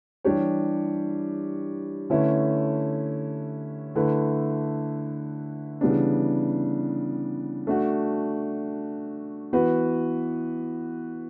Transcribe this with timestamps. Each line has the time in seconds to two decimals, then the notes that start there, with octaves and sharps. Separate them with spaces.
0.24 E3 G3 D4 G4 C#5
2.10 D3 A3 C#4 E4 B4
3.95 D3 A3 E4 B4
5.81 C#3 E3 G3 B3 D4
7.67 A3 D4 F#4
9.53 E3 B3 F#4 B4